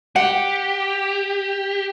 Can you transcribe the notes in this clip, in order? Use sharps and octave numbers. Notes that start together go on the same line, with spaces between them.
G4 F#5